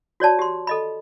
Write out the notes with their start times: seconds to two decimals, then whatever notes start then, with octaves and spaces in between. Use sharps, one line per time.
0.20 F#4 C#5 D5 A5
0.39 G4 C6
0.67 A4 D#5 B5